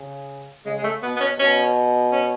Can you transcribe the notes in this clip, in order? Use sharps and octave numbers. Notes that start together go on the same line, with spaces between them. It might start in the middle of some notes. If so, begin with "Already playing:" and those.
Already playing: C#3
C#3 G#3
G#3
A3
B2 B3
B3
C#4
B2 C#4
C#4